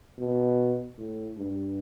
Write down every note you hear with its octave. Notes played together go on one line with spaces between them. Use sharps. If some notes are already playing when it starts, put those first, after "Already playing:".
B2
A2
G2